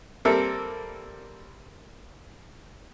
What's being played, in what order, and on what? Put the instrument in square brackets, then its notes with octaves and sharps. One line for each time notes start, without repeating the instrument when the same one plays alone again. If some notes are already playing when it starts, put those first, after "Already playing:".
[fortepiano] G3 A#3 C4 A4 A#4 E5